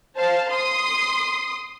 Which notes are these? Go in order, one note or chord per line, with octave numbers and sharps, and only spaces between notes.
C5 F5 A5
C6 D#6